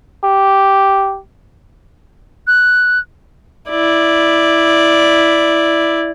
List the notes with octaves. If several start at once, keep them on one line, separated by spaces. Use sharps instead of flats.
G4
F#6
E4 D5